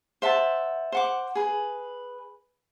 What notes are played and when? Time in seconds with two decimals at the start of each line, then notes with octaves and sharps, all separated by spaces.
0.22 C5 E5 F#5 A5
0.92 C5 F#5 D6
1.35 G#4 B4